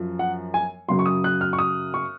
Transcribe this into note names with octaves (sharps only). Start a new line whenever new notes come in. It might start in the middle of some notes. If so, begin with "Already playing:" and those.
Already playing: F#2 F3
F#5
G#5
F#2 C#3 F#3 C6
C#6
D#6
F#6
F6
C#6
D#6
C#6